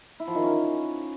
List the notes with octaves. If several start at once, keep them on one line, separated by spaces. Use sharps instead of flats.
E4
F3
D#3
C#4